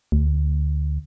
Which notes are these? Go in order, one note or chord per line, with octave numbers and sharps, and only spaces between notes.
D2